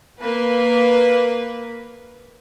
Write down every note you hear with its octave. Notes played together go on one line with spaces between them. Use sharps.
A#3 B4